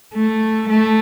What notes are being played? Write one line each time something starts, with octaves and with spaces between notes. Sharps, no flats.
A3
A3